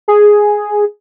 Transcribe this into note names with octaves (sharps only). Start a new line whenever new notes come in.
G#4